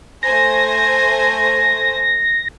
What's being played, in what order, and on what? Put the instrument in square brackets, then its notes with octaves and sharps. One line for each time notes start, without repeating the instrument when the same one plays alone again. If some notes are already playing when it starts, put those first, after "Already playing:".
[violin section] A3 C5 G#5 [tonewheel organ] A#6